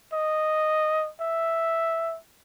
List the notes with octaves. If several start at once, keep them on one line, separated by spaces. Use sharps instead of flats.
D#5
E5